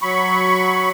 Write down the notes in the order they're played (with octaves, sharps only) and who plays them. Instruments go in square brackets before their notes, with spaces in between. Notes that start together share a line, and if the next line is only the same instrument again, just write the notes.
[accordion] F#3 B5 C#6